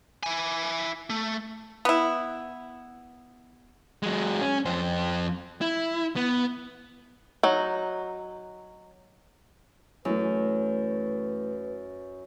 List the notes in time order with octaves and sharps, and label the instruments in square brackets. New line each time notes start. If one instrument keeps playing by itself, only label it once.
[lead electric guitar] E4 G#5
A3
[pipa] B3 E4
[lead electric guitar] F#3 G#3
C#4
F2 C5
E4
B3
[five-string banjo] F#3 D#4
[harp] F#2 [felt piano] E3 A3 [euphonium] B4